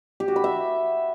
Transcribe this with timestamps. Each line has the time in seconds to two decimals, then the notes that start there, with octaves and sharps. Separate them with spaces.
0.20 G4
0.28 F#4
0.36 B5
0.44 E5